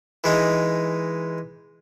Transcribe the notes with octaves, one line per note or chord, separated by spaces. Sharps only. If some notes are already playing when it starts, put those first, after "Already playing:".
E3 G#3 D#4